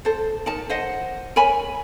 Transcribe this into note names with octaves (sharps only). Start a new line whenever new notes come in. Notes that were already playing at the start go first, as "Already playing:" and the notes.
A4 C5
D#4 A#4 A5
C5 D#5 F#5
A#4 C#5 G#5 B5